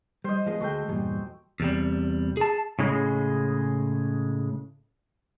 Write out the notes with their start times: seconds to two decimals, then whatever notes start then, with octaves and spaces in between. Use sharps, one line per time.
0.24 G3 C5 D#5
0.46 F3 G#3 B3
0.60 D2 G#3 F#4 A4 G5
0.88 E2 G2 A#2
1.60 E2 C3 G3
2.37 G#4 A5
2.79 A2 C#3 G#3